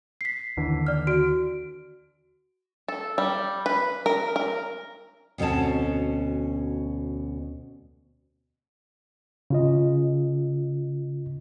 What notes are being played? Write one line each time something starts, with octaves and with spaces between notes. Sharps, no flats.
B6 C7
D#2 D3 E3
D5 F6
F#4 D7
A4
G3
B4
A#4
A#4
D2 B2 C4 C#4 A5
C#3 F4 D#5